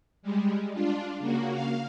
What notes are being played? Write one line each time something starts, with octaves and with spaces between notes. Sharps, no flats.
G3 G#3
D4 F4
C#3 A#3 F#4
F5